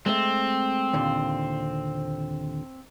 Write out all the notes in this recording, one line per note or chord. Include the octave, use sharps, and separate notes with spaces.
G#3 A3 C4
D#2 A#2 D3